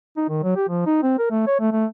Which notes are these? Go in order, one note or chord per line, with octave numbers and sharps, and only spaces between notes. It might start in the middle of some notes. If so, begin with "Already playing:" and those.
D#4
D#3
F#3
G4
F3
D#4
C4
A#4
A3
C#5
A3
A3